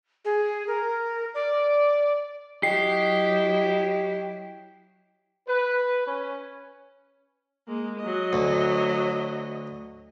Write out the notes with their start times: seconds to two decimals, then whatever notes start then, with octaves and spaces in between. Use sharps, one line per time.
0.25 G#4
0.67 A#4
1.34 D5
2.63 F#3 E4 G4 D#5 C7
5.47 B4
6.06 C#4
7.68 G#3 A#3
8.00 F#3 D#5
8.33 D2